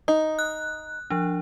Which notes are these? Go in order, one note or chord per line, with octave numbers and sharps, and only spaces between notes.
D#4 D#6
F#6
F3 D4